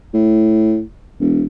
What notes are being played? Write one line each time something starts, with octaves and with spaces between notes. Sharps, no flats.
A2
E1